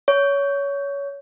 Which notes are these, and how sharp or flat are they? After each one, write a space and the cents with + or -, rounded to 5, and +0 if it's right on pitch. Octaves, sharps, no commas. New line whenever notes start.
C#5 +20